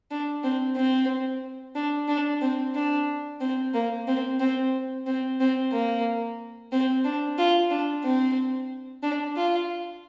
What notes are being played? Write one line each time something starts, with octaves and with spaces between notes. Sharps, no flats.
D4
C4
C4
D4
D4
C4
D4
C4
A#3
C4
C4
C4
C4
A#3
C4
D4
F4
D4
C4
D4
F4